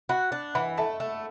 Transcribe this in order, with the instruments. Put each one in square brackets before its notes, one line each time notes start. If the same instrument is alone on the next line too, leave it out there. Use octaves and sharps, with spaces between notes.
[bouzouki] F#4 [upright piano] F#5 B5
[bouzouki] D4
[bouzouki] E3 [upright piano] F#5 B5
[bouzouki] A3 [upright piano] E5 A5
[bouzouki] A3